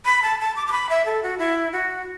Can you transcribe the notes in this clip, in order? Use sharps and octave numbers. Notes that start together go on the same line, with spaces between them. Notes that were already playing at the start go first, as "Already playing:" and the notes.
B5
A5
A5
D6
D6
B5
E5
A4
F#4
E4
F#4